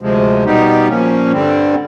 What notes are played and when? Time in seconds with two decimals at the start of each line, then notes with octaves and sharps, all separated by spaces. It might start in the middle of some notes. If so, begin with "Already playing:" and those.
0.01 D2 C3 F3 G#3
0.45 B2 G3 B3 D#4 G4
0.88 A#2 F3 A#3 C#4
1.32 G2 D3 G3 C4